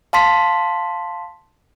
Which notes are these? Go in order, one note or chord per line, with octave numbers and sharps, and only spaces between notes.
F5 A5 C6 B6